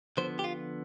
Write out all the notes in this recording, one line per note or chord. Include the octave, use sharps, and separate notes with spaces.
D3 F3 B3 C5
G4
F4